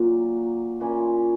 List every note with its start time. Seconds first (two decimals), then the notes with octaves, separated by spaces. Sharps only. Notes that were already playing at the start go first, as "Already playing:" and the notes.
Already playing: A#2 F#3 A#3
0.80 A#2 A#3 C#4 E4